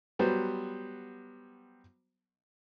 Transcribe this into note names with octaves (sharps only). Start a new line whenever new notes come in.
F#3 G3 B3 C5